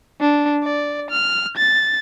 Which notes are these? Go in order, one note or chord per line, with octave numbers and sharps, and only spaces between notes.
D4
D5
F6
A6